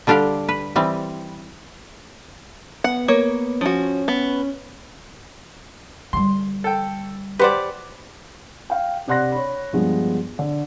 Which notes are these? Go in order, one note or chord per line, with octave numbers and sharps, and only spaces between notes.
D3 G3 D4 G4 F5
B4
E3 G3 C4
B3 F#5
A#3 C#5
F3 C#4 F#4
B3
D3 G3 C6
A4 G5
G4 B4 C5 D5 F#5
F5 G5
C3 D5 F#5 C6 F#6 A#6
C#5 B5
G2 F3 G#3 B3
D3